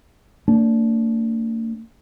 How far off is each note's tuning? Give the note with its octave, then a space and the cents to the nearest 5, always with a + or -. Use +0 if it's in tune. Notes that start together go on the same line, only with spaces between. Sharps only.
A#3 -45 D4 -20